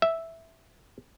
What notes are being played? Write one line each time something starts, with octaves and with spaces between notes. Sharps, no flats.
E5